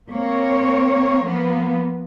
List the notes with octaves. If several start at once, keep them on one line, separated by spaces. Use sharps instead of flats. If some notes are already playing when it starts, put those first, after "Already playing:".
A#3 C4 C#5
F3 A#3 B3